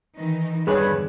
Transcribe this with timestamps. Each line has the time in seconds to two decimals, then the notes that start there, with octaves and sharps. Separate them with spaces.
0.16 D#3 E3 D#4
0.67 E2 G2 D3 G#4 B4 C#5